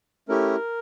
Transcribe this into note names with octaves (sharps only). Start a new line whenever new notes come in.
A3 C#4 E4 G4 A#4